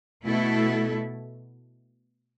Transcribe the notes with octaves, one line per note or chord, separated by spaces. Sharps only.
B2 A3 E4 A4